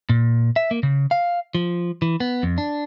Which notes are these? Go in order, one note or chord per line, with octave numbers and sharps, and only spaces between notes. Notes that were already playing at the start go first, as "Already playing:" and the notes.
A#2
E5
A#3
C#3
F5
F3
E3
B3
F2
D4